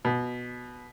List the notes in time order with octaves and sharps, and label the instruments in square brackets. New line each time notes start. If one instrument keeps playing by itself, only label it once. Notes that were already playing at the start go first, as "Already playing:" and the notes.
[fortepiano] B2